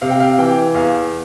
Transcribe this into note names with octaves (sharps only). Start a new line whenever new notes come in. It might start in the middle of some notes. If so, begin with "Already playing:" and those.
C3 F5
G5
F5
E3 G5
E2 F5